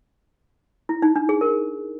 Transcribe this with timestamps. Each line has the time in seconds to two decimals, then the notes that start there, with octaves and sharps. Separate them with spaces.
0.89 E4
1.02 D#4
1.16 D4
1.29 G#4
1.41 A#4